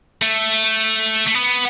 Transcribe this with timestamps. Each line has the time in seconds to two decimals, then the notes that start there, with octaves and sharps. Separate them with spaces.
0.22 A3
1.27 A3
1.35 B3